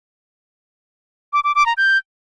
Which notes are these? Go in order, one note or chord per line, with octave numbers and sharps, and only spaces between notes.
D6
D6
D6
A#5
G6